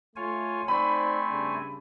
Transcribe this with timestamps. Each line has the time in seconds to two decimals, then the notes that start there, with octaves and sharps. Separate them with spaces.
0.16 A3 F4 C#5 G#5
0.68 A3 C4 D#4 C5 D5 G#5 B5
1.29 G2 C#3 D4